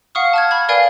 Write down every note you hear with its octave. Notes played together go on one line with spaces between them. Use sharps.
F5 F#5 C#6 D#6 F6
A5 F6 G#6
B5 C#6 G#6
A#4 B4 D5 F5 G5 G#5